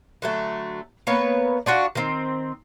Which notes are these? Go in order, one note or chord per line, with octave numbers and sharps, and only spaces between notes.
D3 F#3 A3
A#3 B3 B4 C#5
D4 F4 F#4
D#3 C4